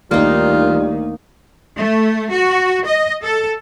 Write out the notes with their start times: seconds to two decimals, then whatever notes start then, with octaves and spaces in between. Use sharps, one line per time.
0.11 D2 D#3 G3 A#3 D#4 F4
1.78 A3
2.31 F#4
2.85 D#5
3.23 A4